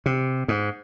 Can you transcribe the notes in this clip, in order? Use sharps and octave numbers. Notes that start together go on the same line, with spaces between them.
C3
G#2